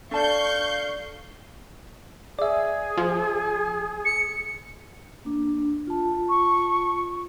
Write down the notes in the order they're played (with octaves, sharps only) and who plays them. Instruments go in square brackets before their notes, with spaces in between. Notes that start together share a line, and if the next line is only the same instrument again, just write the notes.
[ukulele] D4 A5 [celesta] A4 D5 [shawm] F5 [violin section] C#6 G6
[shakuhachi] G#4 [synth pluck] D5 E5
[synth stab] F3
[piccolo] C#7
[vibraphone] A#3 D4
F4 A5
[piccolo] C#6